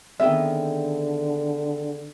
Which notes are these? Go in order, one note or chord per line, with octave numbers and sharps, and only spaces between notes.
D3 D#3 B3 C4 G#4 E5 G5